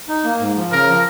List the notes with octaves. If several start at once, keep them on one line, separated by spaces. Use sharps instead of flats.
D#4
A#3
G#2
F3
C#3 A#4
F3